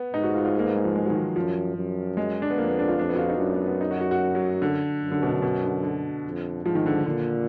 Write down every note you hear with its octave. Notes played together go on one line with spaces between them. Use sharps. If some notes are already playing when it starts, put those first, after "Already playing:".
Already playing: B3
G#2 D#4
F#4
F4
F4
A#3
B3
G#3
F3
G#3
F#3
D#3
F3
F#2 F3
F#2
G#3
D4
B3
F2 A#3
B3
D4
F4
F2 D4
B3
F#4
F4
D#4
F#2 D4
B3
B3
D#4
F#4
F#4
F#4
F#3
D3
F#2
D3
B2
D3
B2
D3
D3
F2
G#2 F3
D#3
D3
A#2 D3